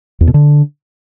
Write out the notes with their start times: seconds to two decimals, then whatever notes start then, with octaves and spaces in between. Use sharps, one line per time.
0.21 E2
0.27 B2
0.34 D3